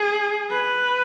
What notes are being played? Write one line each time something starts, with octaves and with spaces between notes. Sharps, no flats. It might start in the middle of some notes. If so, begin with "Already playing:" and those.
Already playing: G#4
B4